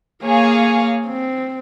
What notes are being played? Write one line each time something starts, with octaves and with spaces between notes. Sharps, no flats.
A#3 G#4 C#5 F5 G#5
C4